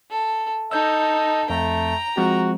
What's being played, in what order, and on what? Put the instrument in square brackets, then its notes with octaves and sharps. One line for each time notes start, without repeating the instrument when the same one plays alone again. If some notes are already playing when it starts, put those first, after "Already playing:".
[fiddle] A4
[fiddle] D#4 A4 [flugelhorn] D#5 [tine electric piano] E6 G6
[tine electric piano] F2 [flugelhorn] A3 [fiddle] G5 A#5
[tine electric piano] F3 G#3 C4 [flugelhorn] F#4